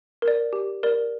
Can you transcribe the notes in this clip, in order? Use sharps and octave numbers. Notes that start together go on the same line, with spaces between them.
A#4
D5
G4
A#4 D5